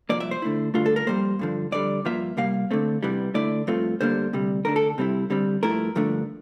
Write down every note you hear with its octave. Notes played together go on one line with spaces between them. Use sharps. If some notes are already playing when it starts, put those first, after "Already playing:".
C2 A#2 F3 A#3 D5
E5
C5
D3 A3 E4
G2 D3 A3 F4
A4
A#4
F2 C3 G3 A#3 C5
G2 D3 F3
F2 D3 G3 D5
G2 F3 A#3 F4 E5
C2 C3 G3 A#3 F5
D3 A3 C4
E2 C3 E3 G3
D3 A3 E4 D5
G2 F3 A3 C4 F4
D2 D3 G3 A#3 C5
D2 C3 G3
D3 A3 D4 A#4
A4
C3 G3 C4 E4
D3 G3 C4
G2 F3 A3 E4 A#4
G2 D3 F3 A3 D4